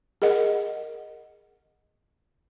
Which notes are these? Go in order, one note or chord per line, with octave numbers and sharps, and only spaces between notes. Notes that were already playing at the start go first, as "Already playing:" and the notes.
G#4 A#4 D#5 F#5